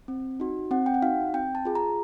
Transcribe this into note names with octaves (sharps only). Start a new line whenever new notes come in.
C4
D#4 F#4
C4 F#5
G5
F#5
D#4 F#4 F5
C4 G5
A5
F4 G#4
A#5